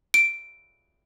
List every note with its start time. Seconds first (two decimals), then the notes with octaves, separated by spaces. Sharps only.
0.14 D7